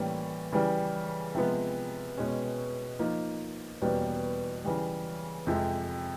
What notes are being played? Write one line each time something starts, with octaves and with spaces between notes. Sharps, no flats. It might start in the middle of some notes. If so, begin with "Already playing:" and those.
Already playing: A2 E3 G3 A#3 C#4
C#3 E3 G3
C3 F3 G#3 B3
B2 G#3 C#4
F3 A#3 D#4
E2 B2 G3 A#3 C#4
C#3 E3 G3
F2 C3 F3 G#3